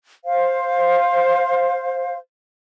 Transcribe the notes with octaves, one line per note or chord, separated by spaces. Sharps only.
C5 F5